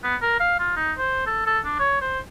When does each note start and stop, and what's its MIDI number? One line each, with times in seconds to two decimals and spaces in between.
0.04 0.16 59
0.22 0.39 70
0.40 0.59 77
0.60 0.76 65
0.77 0.92 63
0.98 1.22 72
1.27 1.42 69
1.47 1.60 69
1.65 1.76 62
1.79 2.01 73
2.01 2.19 72